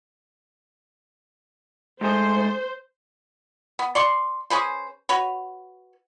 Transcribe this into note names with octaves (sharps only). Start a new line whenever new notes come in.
G#2 A3 G#4 C5
B3
D5 C6 C#6
C#4 G#4 B4 C5
F#4 B4 C#5